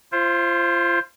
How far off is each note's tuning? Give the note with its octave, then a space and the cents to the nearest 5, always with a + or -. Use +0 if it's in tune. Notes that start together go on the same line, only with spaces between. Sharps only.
F4 -30 C5 +15